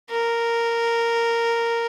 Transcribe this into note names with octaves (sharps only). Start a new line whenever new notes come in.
A#4